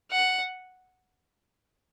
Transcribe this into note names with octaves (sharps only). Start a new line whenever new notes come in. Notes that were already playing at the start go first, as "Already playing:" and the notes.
F#5